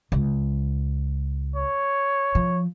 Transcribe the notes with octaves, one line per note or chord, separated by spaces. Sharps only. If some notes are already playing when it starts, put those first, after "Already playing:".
C#2
C#5
F3